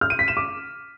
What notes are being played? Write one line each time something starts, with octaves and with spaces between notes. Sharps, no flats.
F6
D#7
B6
E7
D6